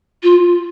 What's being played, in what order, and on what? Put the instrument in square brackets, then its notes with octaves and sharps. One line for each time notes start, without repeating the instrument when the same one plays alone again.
[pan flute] F4